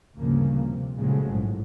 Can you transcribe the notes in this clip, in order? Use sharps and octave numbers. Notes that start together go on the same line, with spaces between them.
D2 G2 A#2 C#3 F3 A#3
C3
A#2 C#3 F3 F#3 G#3 A3
A1 G#2